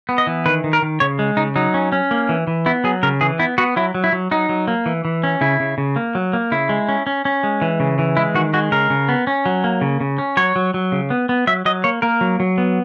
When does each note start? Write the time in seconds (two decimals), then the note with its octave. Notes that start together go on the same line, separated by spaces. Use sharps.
0.09 B3
0.18 D#5
0.27 E3
0.46 D#3 B4
0.64 D#3
0.73 A#4
0.82 D#3
1.00 C#3 C#5
1.19 G#3
1.37 C#3 D#4
1.56 F#3 D#4
1.74 C#4
1.92 C#4
2.11 A#3
2.29 E3
2.47 E3
2.66 B3 E4
2.84 F#3 G#4
3.03 C#3 A#4
3.21 E3 G#4
3.39 B3 E4
3.58 B3 F#4
3.76 F#3 E4
3.95 F#3
4.04 E4
4.13 F#3
4.31 F#3 D#4
4.49 F#3
4.68 A#3
4.86 E3
5.05 E3
5.24 C#4
5.41 C#3 E4
5.60 C#3
5.78 C#3
5.96 A#3
6.15 F#3
6.33 A#3
6.52 C#3 E4
6.69 G#3
6.89 C#4
7.07 C#4
7.25 C#4
7.43 G#3
7.62 E3
7.80 C#3
7.99 E3
8.17 G#3 E4
8.35 D#3 F#4
8.53 G#3 F#4
8.72 C#3 A#4
8.90 C#3
9.09 B3
9.27 C#4
9.46 F#3
9.64 A#3
9.81 C#3
10.00 C#3
10.18 C#4
10.37 F#3 C#5
10.56 F#3
10.74 F#3
10.92 C#3
11.10 B3
11.29 B3
11.47 F#3 E5
11.65 F#3 D#5
11.84 A#3 C#5
12.02 A#3 A#4
12.21 F#3
12.40 F#3
12.58 B3